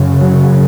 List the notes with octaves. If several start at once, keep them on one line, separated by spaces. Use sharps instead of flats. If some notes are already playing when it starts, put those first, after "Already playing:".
Already playing: F#2 C#3
F#3